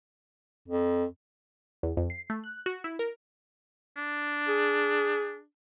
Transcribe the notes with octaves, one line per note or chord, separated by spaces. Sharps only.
F2
E2
F2
C7
A3
F#6
F#4
E4
A#4
D4
G#4